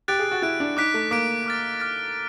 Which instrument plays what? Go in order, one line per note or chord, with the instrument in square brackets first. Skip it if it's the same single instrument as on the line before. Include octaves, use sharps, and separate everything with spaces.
[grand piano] G4 [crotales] F#6 A6 D7
[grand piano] G#4
F#4
[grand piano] E4 [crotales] F#6 A6 D7
[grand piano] D4
[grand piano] D#4 [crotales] D6 F#6 B6 D7
[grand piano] A3
[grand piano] A#3 [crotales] D6 F#6 B6 D7
[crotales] D6 F6 A6
D6 F6 A6